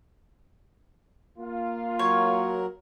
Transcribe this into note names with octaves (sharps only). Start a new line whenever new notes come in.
A#3 F4
F#3 F#4 A#4 C#5